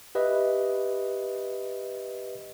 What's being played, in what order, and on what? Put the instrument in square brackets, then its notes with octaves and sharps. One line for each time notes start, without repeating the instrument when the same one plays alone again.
[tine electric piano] G4 B4 D#5 E5